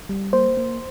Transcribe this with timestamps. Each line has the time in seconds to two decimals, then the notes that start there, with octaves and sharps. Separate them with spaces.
0.09 G3
0.33 A#3 C5
0.57 A#3